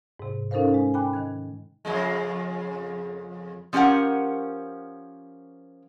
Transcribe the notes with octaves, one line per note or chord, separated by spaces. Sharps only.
G#2 C3
C#4 D#4 A4 A#4 C5 F5
G#3
G5 G#5 B5 D6 F#6
D#3 F#6 G#6
F2 C#3 G#3
F3 C#4 G4 A#4 F#5